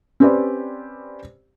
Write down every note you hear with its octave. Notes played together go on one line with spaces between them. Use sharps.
C4 C#4 G4 B4 C5 D5